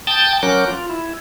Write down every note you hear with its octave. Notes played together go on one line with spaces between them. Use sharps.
G5 A5 D#6 G6 A6
F#3 C#4 A#4 D6 F#6 G6
F4
E4